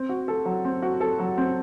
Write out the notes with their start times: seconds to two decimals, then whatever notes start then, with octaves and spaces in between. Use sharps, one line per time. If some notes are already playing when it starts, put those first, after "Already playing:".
Already playing: C4
0.09 F#4
0.28 A4
0.46 F#3
0.65 C4
0.82 F#4
1.01 A4
1.19 F#3
1.38 C4